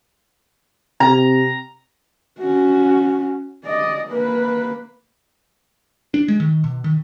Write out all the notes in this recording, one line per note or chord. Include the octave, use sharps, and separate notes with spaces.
C3 A#5
C#4 F#4
D5 D#5
A#3 B4
D4
G#3
D#3
B2
D#3